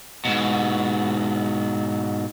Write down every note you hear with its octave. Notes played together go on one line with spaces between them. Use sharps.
G#2 B2